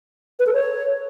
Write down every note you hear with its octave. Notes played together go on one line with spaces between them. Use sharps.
B4
A4
C#5